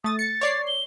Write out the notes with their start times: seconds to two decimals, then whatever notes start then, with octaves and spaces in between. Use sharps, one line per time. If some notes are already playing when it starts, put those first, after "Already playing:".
0.04 A3 D#6 A6
0.19 A6 C#7
0.41 C#5 D5 C7
0.67 G7